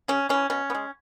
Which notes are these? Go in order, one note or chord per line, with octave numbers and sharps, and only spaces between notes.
C#3 C#4
E3 G#3 C#4
B2 C#4
B3
G#3